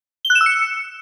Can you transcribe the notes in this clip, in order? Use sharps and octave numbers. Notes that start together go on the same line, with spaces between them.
G7
F#6
E7
E6
C#7